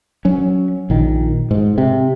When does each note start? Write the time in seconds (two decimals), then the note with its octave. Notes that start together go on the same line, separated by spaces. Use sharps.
0.25 F#3 C#4
0.90 A#1 D#3
1.51 G#2
1.78 C3